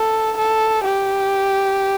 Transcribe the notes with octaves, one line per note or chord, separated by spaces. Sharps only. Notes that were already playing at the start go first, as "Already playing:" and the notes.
Already playing: A4
A4
G4